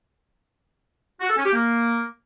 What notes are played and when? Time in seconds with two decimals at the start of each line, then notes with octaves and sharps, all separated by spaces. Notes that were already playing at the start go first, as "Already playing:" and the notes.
1.21 F#4
1.29 A4
1.37 C#4
1.45 G4
1.53 A#3